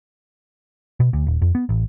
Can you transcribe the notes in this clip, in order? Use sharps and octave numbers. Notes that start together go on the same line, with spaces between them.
B2
D2
D#1
F2
B3
A1